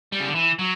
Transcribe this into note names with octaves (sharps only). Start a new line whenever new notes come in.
G3
C#3
D3
E3
F#3